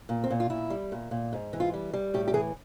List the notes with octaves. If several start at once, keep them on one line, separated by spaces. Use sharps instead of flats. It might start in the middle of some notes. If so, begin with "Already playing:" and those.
A#2
C4
A#2
F4
A#2 E4
G3
A#2
A#2
G#2
E3
F4
G3
G3
A2 G4
G4
E3 G#4